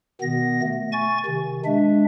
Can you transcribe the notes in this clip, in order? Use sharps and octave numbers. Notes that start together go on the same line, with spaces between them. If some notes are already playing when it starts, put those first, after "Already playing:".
B2 D#3 B3 A#6
A3
G#5 C#6 A6
C3 D#3
G#3 D4 E5